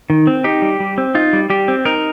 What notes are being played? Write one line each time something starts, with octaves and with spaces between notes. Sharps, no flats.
D#3
C4
D#4 G4
G3
G3
C4
D#4 F4
G3
G3 G4
C4
D#4 A#4